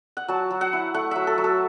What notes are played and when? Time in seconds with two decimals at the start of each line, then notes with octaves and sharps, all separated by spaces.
0.17 F#5
0.28 F#3 A5
0.51 F#3
0.61 F#5
0.73 E4
0.94 A3 F#5
1.11 F#3 E5
1.27 A4
1.38 F#3
1.44 A4